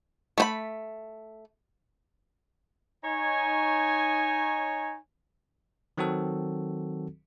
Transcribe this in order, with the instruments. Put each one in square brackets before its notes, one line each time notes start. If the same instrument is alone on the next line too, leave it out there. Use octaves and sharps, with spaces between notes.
[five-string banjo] A3 C5 B5
[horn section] D#4 C#5 G#5
[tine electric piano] D#3 F#3 C4 F#4 A4